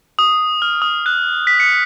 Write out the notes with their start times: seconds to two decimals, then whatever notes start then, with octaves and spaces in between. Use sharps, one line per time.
0.19 D#6
0.62 F6
0.82 D#6
1.06 F#6
1.47 B6
1.60 C#7